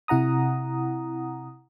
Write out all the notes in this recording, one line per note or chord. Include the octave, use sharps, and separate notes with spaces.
C3 E4 F#5 A#5 D#6